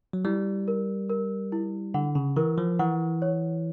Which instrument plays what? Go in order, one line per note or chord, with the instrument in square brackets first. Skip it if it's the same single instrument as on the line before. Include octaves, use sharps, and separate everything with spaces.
[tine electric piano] F#3
[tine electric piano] G3 [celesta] E4
[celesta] A#4
A#4
E4
[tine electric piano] D3 [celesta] F#5
[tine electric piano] C#3
[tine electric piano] E3 [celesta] A#4
[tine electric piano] F3
[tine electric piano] E3 [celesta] F#5
[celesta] C#5